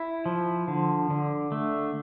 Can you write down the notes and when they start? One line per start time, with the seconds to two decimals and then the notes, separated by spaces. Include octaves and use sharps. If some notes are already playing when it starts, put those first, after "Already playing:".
Already playing: E4
0.26 F3
0.68 D3
1.10 D3
1.52 A3